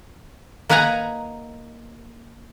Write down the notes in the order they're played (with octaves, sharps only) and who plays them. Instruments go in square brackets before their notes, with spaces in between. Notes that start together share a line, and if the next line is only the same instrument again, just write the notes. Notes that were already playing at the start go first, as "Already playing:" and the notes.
[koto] A#3 D#4 B4 F#5 G#5 A#5